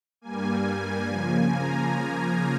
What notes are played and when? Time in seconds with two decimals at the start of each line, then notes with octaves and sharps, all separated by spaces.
0.21 G2 G3 A#3 G#5
1.07 C#3 F3 A#3 G#5
1.50 A#5